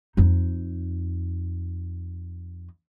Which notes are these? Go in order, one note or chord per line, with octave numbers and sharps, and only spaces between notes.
F2 D#4